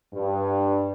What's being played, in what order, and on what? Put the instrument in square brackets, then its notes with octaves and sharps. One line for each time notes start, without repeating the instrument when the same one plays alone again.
[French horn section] G2